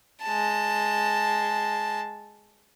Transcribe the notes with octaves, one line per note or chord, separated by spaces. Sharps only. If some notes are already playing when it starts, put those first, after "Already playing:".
G#3 A5